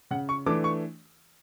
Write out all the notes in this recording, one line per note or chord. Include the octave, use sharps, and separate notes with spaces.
C#3 F#5
C#6
E3 A3 D4 D6
C#6